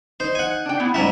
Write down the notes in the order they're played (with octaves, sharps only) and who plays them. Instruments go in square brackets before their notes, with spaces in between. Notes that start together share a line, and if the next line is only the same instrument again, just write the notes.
[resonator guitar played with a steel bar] D#4 [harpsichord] C5
[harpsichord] F#5 G#5
[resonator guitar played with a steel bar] D4 G5
B3 E4
[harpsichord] G#2 G3 E5 [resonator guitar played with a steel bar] C#4 A#5